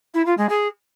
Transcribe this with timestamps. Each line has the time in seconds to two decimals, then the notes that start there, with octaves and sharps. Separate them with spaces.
0.14 E4
0.25 F4
0.37 G#3
0.49 G#4